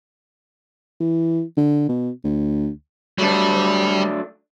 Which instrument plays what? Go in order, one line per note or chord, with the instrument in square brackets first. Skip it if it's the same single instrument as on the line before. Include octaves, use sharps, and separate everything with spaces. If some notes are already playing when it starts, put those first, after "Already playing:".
[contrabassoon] E3
D3
B2
D2
[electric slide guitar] F#3 A3 D4 [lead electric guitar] G3